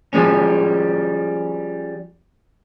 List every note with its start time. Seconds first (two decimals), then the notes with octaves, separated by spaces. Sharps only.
0.13 F3 G3 G#3 C#4